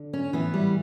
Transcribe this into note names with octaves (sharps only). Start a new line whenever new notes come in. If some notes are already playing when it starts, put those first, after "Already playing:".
Already playing: D3
C#4
A2 E3 B3
G3